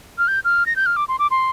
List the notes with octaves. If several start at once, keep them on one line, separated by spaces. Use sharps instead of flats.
F6
G6
F6
A#6
G6
F6
D6
C6
D6
C6